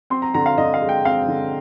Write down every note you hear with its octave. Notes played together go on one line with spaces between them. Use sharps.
C4 C6
A#5
D3 A#5
F5
D3 D#5
F5
G#3
G5
C4 F5
D3